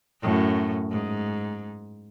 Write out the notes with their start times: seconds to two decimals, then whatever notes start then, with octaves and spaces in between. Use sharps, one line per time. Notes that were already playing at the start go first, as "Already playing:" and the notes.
0.21 F#2 A2
0.91 G#2